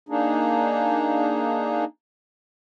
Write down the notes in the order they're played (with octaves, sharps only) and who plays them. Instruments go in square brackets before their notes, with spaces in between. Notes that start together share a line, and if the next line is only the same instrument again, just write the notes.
[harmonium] A#3 D4 D#4 G#4